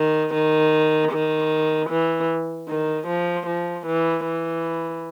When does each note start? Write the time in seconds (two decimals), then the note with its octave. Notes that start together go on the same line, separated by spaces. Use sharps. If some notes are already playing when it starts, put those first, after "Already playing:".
Already playing: D#3
0.34 D#3
1.11 D#3
1.89 E3
2.68 D#3
3.07 F3
3.46 F3
3.86 E3
4.25 E3